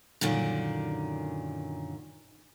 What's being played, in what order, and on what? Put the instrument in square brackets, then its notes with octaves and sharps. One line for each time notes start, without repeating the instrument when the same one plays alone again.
[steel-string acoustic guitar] F#2 A#2 D3 D#3